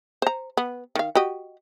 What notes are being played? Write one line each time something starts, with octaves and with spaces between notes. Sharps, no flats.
C5 A#5
B3
D#3 F5
F#4 G4 D#5